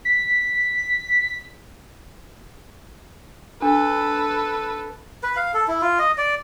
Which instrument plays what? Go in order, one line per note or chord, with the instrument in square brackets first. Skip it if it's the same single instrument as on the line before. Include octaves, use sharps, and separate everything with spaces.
[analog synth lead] B6
[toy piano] D4 [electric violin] A4 B4
[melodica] B4
F5
A4
E4
F4
D#5
D5